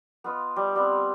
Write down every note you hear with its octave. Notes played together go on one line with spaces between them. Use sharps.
B3 F4 D#5
G3
G3 B3 C4